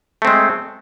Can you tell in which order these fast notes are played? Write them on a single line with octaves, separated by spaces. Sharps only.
A3 C4 G#3